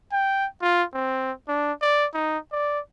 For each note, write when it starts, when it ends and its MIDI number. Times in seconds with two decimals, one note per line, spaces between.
0.12 0.46 79
0.62 0.83 65
0.94 1.32 60
1.48 1.72 62
1.81 2.06 74
2.14 2.38 63
2.52 2.79 74